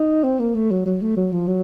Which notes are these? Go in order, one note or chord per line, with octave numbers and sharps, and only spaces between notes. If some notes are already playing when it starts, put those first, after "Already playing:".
Already playing: D#4
C4
A#3
A3
F#3
F#3
A3
F#3
F3
F#3